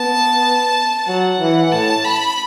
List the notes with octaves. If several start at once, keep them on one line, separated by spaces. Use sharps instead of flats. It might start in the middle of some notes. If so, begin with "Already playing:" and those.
Already playing: B3 A5
F#3 F#5
E3
A2 A5
B5